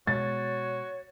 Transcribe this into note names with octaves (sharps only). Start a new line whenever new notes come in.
B2 G#3 F#4 C#5 A6